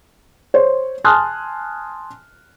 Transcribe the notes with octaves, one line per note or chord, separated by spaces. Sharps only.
C5 C#5
G#5 A5 C6 D#6 F6 F#6